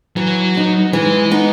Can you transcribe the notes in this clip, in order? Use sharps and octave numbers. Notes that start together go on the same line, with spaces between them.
E3 F#3
B3 D#4
E3 G#3
B3 D#4